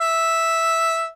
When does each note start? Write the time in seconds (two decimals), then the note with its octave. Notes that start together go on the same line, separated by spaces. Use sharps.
0.01 E5